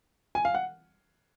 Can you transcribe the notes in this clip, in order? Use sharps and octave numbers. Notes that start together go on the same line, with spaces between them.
G#5
F5
F#5